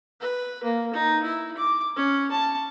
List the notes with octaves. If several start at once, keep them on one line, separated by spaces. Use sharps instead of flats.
B4
A#3
D#4
E4
D6
C#4
A5